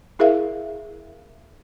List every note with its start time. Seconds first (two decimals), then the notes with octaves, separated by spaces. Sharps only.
0.19 E4 G#4 A#4 E5 F5